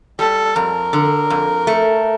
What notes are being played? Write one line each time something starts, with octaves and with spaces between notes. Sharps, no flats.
G3 A4
F2 A#4
D3
F2
A3